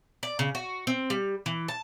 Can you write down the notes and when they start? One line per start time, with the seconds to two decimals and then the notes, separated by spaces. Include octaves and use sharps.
0.23 D5
0.39 C#3
0.55 F#4
0.87 C4
1.10 G3
1.46 E3
1.68 A5